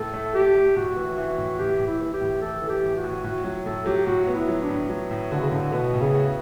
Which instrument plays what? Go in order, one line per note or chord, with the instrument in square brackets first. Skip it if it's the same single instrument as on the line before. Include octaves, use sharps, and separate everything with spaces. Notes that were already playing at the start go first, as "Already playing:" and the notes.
Already playing: [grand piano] A2 [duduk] A4
[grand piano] A3
[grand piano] A3 [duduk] G4
[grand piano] A3
[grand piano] A2 [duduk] F#4
[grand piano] E3
[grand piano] E3 [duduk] F#4
[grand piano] A2
[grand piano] A2 [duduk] G4
[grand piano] A2
[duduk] E4
[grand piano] E3
[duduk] G4
[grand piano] A2
[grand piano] E3 [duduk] A4
[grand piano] E3
[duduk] G4
[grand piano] A2
[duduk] F#4
[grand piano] A2
[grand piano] A2 [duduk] F#4
[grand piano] F#3
[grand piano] A2 [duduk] A4
[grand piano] F#3 [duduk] G4
[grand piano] A2 [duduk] F#4
[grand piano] B3
[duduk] E4
[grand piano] F#3
[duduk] D4
[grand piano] A2
F#3
A2
[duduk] D3 [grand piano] F#4
[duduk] C#3
[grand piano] A2 [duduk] D3
[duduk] B2 [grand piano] B3
[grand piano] A2
[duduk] C#3
[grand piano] F#4